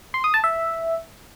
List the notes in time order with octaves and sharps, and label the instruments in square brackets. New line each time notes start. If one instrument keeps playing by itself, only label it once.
[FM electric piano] C6
D#6
A5
E5